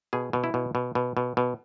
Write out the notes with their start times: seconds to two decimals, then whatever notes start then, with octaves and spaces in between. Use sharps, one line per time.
0.13 B2 G#4
0.33 B2
0.44 E4
0.54 B2
0.75 B2
0.95 B2
1.17 B2
1.37 B2